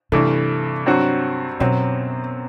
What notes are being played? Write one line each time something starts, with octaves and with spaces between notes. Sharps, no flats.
G2 C3 E3 A3
G2 F#3 C4 F#4
F#2 B2 F#3 C4